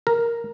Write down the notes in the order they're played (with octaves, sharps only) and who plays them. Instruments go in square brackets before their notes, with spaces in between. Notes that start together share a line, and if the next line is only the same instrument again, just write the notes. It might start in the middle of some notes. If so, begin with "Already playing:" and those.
[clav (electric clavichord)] A#4